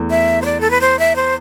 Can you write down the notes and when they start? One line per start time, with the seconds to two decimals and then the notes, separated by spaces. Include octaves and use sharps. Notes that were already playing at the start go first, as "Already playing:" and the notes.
Already playing: E2 A3
0.10 E5
0.42 C5
0.45 D5
0.60 A4
0.71 B4
0.81 C5
0.99 E5
1.16 C5